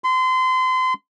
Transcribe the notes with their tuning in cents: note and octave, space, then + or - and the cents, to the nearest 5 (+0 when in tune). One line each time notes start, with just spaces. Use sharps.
C6 -30